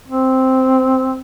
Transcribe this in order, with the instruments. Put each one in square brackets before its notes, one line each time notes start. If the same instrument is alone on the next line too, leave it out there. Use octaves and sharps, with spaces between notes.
[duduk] C4